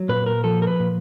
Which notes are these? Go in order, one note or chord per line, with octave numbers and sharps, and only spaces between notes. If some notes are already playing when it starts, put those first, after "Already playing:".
Already playing: F#3
A#2 B4
A#4
F3 A4
A#4
B4
A#2